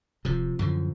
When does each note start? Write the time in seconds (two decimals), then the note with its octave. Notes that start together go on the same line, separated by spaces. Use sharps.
0.25 D1 C3 F3
0.59 F#2 A2 D3 F3